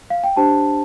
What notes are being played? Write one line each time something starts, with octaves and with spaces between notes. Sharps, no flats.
F5
G5
D4 G4 C5 A5